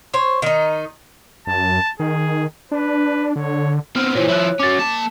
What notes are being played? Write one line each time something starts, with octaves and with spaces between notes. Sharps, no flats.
C5 C#5
D#3 D#4
F#2 A5
D#3 G#4
D4 B4
D3 C#5
B3 C4 F6
A#2 E3 C5 C#5
F3 E4 C#5 F#6
F#3 C#4 D6 A6
A#3 A5